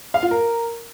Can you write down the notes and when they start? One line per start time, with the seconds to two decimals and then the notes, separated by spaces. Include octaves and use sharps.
0.14 F5
0.23 F4
0.31 A#4